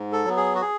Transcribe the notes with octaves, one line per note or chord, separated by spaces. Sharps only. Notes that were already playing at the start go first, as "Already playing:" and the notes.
Already playing: G#2
A4
F#3 B3
G#4
F#4
G#4